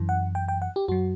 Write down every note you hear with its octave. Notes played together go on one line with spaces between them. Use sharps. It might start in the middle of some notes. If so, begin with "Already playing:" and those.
Already playing: F#2 E3
F#5
G5
G5
F#5
G4
F#2 F#3 F#4